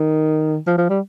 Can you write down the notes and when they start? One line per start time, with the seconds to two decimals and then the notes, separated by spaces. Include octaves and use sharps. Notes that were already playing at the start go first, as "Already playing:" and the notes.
Already playing: D#3
0.67 F3
0.77 F3
0.89 G3